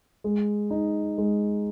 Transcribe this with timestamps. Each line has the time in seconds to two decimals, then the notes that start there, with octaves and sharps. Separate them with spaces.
0.24 G#3
0.71 D#4
1.18 G#3